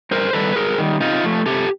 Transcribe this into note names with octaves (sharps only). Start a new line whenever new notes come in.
G2 A#4 C5
D#3 G3 A4 B4
G2 G#4 A#4
D#3 G3
C3 D#4 F4
F3 A3
C3 G4 A4